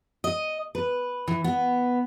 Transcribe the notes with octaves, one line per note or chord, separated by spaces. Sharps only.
D#5
B4
E3
B3